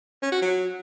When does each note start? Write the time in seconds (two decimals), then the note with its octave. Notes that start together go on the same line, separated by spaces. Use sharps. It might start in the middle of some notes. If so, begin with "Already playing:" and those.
0.22 C#4
0.32 F#4
0.42 F#3